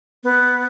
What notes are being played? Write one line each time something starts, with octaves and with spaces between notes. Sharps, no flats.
B3